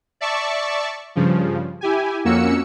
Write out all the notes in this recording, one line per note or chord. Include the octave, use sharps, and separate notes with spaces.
D5 E5 A5 C#6
G2 C#3 F3
E4 G4 G#5
F2 A#3 C#4 F#4 E6 C#7